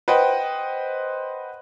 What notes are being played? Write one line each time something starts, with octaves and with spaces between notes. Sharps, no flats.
B4 C5 D#5 F#5 G5